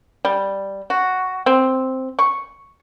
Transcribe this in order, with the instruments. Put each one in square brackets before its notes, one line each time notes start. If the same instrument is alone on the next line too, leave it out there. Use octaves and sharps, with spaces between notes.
[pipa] G3
F#4
C4
C#6